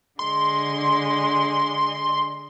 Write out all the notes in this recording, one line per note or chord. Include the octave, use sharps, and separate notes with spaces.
D3 G#3 C6